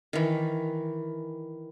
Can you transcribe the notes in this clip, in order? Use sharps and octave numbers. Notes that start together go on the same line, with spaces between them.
D#3 E3